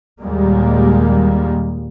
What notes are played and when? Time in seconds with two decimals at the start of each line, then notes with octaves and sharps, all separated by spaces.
0.20 D#2 A#2 G3 G#3 A#3